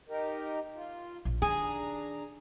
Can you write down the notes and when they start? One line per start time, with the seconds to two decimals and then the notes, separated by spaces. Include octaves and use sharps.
0.09 D#4 G4 A#4
0.76 F4
1.25 A#1
1.42 D#3 D4 G#4 A#5